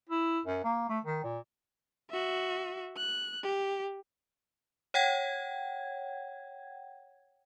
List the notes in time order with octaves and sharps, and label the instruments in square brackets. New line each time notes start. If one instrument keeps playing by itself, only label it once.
[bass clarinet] E4
F#2
A#3
A3
D#3
A#2
[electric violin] F#4 E5
F#6
G4
[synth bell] C#5 F#5 G5 G#6